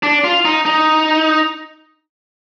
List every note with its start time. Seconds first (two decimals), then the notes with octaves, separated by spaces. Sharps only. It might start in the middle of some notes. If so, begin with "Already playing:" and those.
0.03 D4
0.24 F4
0.45 D#4
0.66 D#4